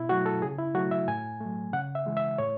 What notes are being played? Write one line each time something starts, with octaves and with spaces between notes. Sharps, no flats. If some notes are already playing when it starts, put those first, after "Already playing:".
Already playing: B2 E4
F#3 A3 F#4
A4
C#3 G#4
E4
F#3 A3 F#4
E5
A2 G#5
F#3 A3
C#3 F#5
E5
E3 G#3
E5
A2 C#5